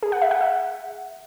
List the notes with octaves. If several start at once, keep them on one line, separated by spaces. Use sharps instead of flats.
G#4
F#5
E5
F#5
E5